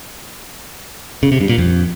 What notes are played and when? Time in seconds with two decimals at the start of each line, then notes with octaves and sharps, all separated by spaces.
1.23 C#3
1.32 C3
1.41 G2
1.49 A#2
1.58 F2